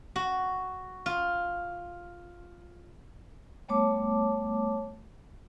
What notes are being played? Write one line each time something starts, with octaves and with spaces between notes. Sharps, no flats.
F#4
F4
G3 A3 B3 C#5 A5 D6